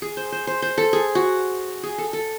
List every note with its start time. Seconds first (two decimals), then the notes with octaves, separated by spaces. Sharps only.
0.02 G#4
0.17 C5
0.32 C5
0.47 C5
0.62 C5
0.78 A4
0.93 G#4
1.15 F#4
1.83 G#4
1.98 A4
2.13 A4